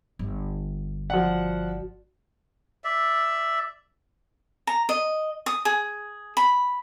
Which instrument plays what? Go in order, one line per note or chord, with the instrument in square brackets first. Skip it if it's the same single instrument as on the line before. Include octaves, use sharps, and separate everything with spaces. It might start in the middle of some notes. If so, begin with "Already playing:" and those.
[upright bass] G1
[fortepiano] F3 F#5 [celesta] F#4 D5
[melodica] D5 E5
[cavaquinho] A#5
D#5
D#6
G#4
B5